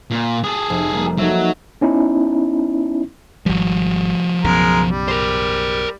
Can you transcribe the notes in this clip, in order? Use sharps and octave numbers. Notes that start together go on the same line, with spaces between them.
A#2
G#4 A4
F1
G3 A#3
F#3 D#4 A4 E5
B3 C#4 D#4 E4
G#1 F3 G3 F#4
B1 F#2 C#3 G#3 A#4
G3
A#4 C5